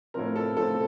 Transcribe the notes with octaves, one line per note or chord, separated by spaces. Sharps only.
A2 F3 C4 A#4
A4
A2 F3 C4 A4